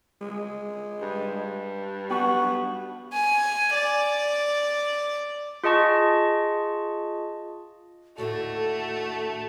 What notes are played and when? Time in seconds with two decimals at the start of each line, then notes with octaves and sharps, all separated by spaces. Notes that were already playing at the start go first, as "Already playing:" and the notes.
0.21 G#3
1.02 G2
2.10 B3 F#4
3.13 G#5
3.74 D5
5.64 F4 G#4 D#5 A5 C#6
8.18 D#2 A2 D3 A3 F#4 A4